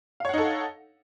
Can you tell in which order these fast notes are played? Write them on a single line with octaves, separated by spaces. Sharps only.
F5 C#5 F#5 D#4 A4